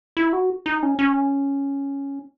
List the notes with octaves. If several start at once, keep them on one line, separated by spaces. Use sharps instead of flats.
E4
F#4
D#4
C#4
C#4